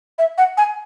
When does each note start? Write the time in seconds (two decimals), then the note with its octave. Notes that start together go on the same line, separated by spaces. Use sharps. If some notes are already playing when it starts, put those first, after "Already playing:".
0.19 E5
0.38 F#5
0.57 G#5